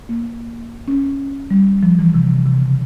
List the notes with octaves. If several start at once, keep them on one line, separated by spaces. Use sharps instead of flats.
A#3
C#4
G3
F3
E3
C3
C3
C3
C#3